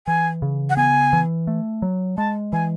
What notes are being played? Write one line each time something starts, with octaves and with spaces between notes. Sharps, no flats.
E3 G#5
C#3
F#5
B3 G#5
E3
A3
F#3
G#3 A5
E3 G#5